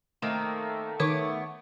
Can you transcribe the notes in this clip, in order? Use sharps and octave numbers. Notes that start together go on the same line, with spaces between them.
D#3 A3 A#3 C4
D#3 B3 C#5 D6